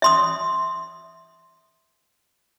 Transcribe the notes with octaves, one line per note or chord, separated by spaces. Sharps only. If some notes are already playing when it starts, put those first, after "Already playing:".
E5 C6 D#6